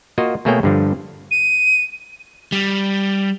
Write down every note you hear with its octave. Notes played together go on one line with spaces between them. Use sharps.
A#3 F4 F#4 D#5
B2 A3 A#3 G#4 C#5 G5
G2 D3 F3
D#7
G3